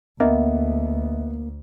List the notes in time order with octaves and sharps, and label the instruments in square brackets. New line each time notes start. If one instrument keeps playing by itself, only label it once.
[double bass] D2 [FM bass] A#3 [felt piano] B3 [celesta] D#5 E5